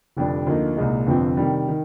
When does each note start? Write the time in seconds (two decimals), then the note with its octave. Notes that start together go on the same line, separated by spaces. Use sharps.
0.17 F1 F2 D3 G3 D4
0.46 D2 D3 F3 A#3 D#4
0.76 C2 A#2 G#3 D#4
1.06 G1 F2 C3 F3 C4
1.37 C3 D#3 G3
1.68 D#3